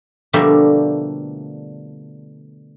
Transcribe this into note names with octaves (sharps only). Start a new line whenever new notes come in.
B2 D3 F3 G3 A3 A#3